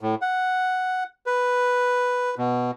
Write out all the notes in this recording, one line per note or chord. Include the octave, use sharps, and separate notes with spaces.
A2
F#5
B4
B2